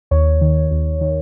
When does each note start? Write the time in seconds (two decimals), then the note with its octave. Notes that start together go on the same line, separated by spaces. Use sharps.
0.11 D#2 C#5
0.41 D#3
0.71 D#2
1.01 D#3